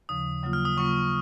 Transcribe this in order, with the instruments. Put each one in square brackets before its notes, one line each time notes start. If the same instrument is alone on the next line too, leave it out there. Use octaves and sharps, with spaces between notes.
[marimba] D#2 C#3 F3 [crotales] D#6
[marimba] C#3 F#3 A#3 F4
[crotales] F6
D#6
[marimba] C#3 F#3 A#3 F4 [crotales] C#6